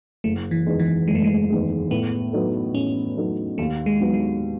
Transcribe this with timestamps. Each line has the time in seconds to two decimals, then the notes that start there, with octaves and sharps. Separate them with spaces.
0.24 F#1 A3
0.51 E3
0.66 E2 D#3 G#3
0.80 E3
1.08 F#1 G#3
1.15 A3
1.24 G#3
1.50 E2 D#3 G#3
1.91 A2 B3
2.33 F#3 B3 D#4 A4
2.74 A2 C#4
3.17 F#3 B3 D#4 A4
3.58 D#2 A3
3.86 G#3
4.00 D#3 F#3 B3
4.14 G#3